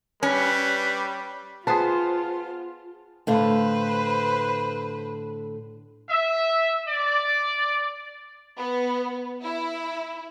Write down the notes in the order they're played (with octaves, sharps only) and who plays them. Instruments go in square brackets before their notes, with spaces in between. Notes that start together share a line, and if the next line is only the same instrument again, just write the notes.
[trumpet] G3 [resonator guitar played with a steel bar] C#4 [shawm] B4
[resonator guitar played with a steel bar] B3 C5 [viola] F4 [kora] G#4 B4 [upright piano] A5
[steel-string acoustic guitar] A2 D3 F5 [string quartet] B4 C5
[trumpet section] E5
D5
[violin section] B3
E4